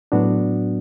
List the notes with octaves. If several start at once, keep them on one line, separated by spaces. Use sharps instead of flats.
A2 F#3 B3 D4 F#4